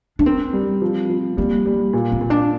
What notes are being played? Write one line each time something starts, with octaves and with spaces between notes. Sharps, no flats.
D4
C4 A#4
G3
F3
F3
G3 A#3
G3
A#2
C4
A#2
D4